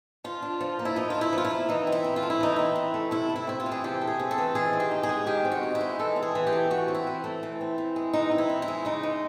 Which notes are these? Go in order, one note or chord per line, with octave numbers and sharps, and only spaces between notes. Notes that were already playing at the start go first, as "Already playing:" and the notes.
F3 F4
D4
F3
A#3
E4
F3 D#4
D4 F4
E4
F3
F4
E4
A#3
E3 D#4
C4
E4
E3
F4
A3
E4
E3 D#4
C4 E4
E3
A3
C3 E4
A3
E4
C4 E4
F4
E3
G#4
C3 G4
A3
G#4
C4
A4
E3
D#3 G#4
C4
G4
D#4
G#4
G#3
D#3 G4
C4
F#4
D#4
E4
G#3
E3 A4
C4
G#4
E3
G4
A3
E3 F#4
C4
E4
E3
A3
E3
C4
E3
G#3
E3 D#4
C4
E4
E3
E4
G#3
C#3 D#4
G#3